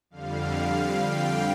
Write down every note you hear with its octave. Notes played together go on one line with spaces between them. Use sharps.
F2 D3 G3 F5
F5
G5